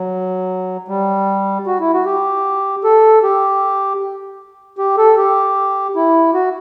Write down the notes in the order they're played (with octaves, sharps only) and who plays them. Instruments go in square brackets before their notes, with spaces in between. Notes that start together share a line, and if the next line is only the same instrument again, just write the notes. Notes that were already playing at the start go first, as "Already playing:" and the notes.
Already playing: [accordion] F#3
G3
F#4
E4
F#4
G4
A4
G4
G4
A4
G4
E4
F#4